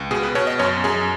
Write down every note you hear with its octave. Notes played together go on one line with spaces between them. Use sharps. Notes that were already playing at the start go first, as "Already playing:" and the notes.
Already playing: C#2
B2 G#4
B4
B2 C#5
D#5
F#2 C#5
F#2 G#4